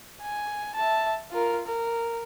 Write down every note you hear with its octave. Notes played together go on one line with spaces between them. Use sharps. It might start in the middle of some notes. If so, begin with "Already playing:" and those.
G#5
E5 A5
F4 A#4
A#4